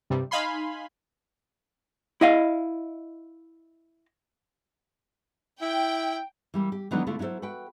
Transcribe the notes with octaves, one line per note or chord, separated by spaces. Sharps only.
G2 C3 G3
D#4 F5 G#5 B5 C6
E4 D#5 F5
E4 G5
E3 G3 A#3
G4
D#3 E3 F#3 A3 B3 D4
D3 A3 E4 F4
F#3 E4 F#4 A4 C5
F#4 B4 G5